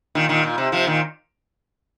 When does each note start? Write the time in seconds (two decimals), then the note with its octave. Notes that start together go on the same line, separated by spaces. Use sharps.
0.15 A#2 D#3
0.29 A#2 D#3
0.44 A#2
0.58 C3
0.72 C3 F3
0.87 A#2 D#3